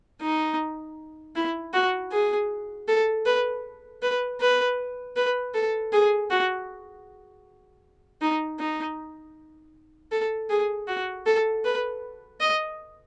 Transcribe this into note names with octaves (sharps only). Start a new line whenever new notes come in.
D#4
E4
F#4
G#4
A4
B4
B4
B4
B4
A4
G#4
F#4
D#4
D#4
A4
G#4
F#4
A4
B4
D#5